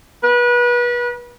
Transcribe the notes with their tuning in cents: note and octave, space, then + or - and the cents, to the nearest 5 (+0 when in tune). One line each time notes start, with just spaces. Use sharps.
B4 -30